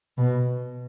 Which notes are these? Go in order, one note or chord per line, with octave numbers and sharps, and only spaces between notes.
B2